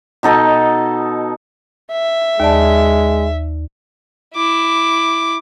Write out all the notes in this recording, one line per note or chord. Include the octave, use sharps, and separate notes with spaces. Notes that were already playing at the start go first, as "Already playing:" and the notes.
B2 D#4 A4 D#5
E5
D#2 G#3 D5 A5
E4 D6